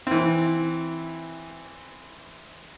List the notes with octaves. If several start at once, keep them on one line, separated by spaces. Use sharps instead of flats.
E3 C4